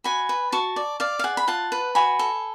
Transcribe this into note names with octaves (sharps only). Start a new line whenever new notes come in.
F#4 G#5 B5
B4
F#4 A5 C#6
D5
D5 F5
F5
G#4 F#5
B5
F4 F#5 A5
B4
F#4 G#5 B5
A4